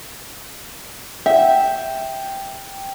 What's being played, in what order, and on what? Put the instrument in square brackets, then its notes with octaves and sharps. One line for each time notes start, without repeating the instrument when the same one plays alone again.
[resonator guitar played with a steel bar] E5 [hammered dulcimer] G5